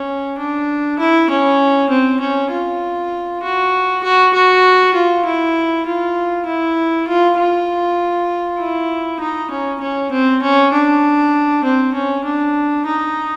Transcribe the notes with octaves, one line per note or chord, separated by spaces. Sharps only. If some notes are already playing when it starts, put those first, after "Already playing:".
Already playing: C#4
D4
E4
C#4
C4
C#4
F4
F#4
F#4
F#4
F4
E4
F4
E4
F4
F4
E4
D#4
C#4
C#4
C4
C#4
D4
C4
C#4
D4
D#4